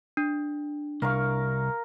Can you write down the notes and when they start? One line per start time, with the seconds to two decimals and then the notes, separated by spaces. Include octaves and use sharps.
0.17 D4
1.02 C2 A#4 F5 C#6